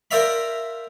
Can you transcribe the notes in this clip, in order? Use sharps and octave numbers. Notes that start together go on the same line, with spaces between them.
A#4 C5 D5 E5 F5 B5